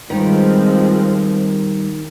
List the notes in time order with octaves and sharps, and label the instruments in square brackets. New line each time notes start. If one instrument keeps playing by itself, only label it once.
[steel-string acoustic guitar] D#3 [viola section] F3 G#3 C4 [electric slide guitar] G3 B4